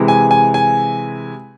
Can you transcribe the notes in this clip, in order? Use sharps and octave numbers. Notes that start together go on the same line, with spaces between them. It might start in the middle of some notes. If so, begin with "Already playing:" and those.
Already playing: C3 E3 G#3
G#5
G#5
G#5